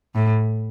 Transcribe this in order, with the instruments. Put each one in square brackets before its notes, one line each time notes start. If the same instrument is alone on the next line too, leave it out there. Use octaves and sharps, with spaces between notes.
[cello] A2